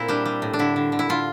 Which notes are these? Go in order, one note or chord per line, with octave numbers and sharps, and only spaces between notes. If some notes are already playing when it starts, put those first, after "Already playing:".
Already playing: A#2 C4 E4
G3 D4
G3
A2
D4
D3 E4
D3
D3
E4
D3 F4